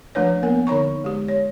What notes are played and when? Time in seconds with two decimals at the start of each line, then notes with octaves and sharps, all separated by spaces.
0.15 F3 A3 D4 B4 C#5
0.43 A#3 B3 A#4
0.67 D3 D#4 C#5 A#5 C#6
1.04 G#3 G4
1.28 C#5